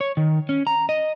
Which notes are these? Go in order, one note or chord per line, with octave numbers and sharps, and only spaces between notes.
C#5
D#3
C#4
A#5
D#5